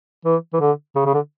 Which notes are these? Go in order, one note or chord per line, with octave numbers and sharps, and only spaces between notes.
E3
E3
D3
C#3
C#3
D3